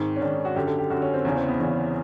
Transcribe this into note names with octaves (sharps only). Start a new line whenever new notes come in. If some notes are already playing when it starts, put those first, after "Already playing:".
Already playing: G#2 D#3 C4
C#4
G#2 D#3 D4
F#4
F#2 D3 G4
A4
G4
F#2 D3 F#4
C#4
C4
E2 C#3 E3 C#4
C4
B3
E2 C#3 E3